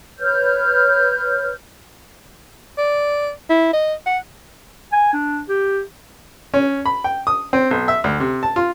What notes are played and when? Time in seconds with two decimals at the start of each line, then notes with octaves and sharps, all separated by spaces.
0.19 B4 C#5 F6 G6
2.78 D5
3.50 E4
3.73 D#5
4.06 F#5
4.92 G#5
5.13 D4
5.49 G4
6.54 C#4
6.86 B5
7.04 G5
7.27 D#6
7.53 C4
7.71 B1
7.88 E5
8.04 D2
8.20 C3
8.43 A5
8.56 F4